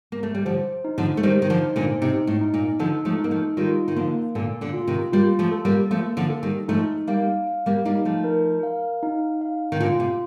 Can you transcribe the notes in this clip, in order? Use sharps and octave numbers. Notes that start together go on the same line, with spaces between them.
A#3
A3
G3
D3 F3 C5
D#4
D3 F3
A3
D#3 G3 C5
D#3
D3 F3
D#4
A#2 D3
C3 D#4
A2
D#4
A#2
D3 F3 A4
F3 A3
D#4
A#3
F3 A3
D#3 G3 F4
D#3
D3 F3 A#3
A#2 D3 A4
A#2 D3
F4
C3 D#3
G3 A#3 F4
F3 A3
A4
G3 A#3
F3 A3 A#3
D3 F3
A4
D#3 G3
F3 A3 D#4
G3 A#3 F5
F5
G3 A#3
G3 A#3 D#4
F3 A3
A#4
F5
D#4
F5
D#3
A#2 D3 F4
C3